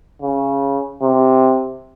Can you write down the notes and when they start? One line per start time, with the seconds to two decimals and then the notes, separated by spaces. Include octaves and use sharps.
0.22 C#3
1.02 C3